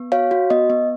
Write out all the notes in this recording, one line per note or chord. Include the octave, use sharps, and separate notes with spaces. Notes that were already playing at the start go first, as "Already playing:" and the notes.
Already playing: B3
F#4 C#5 F5
F#4
B3 D#5
B3